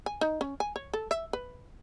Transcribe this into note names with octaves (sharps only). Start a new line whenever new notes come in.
G#5
D#4
C#4
G#5
C#5
A4
E5
B4